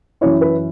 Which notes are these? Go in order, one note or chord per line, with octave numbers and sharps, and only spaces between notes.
F#2 E3 C#4 E4 C#5
B4